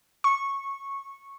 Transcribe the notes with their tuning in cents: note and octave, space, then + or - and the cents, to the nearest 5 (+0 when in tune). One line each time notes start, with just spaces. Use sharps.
C#6 -5